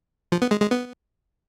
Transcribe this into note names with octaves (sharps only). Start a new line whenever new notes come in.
F3
B3
G#3
G#3
B3